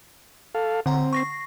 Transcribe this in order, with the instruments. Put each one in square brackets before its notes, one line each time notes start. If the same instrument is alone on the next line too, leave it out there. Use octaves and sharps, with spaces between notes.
[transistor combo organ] A4 F5
[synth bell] D3 F#5 A#5 [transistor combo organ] C4
[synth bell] C#6 A#6 C7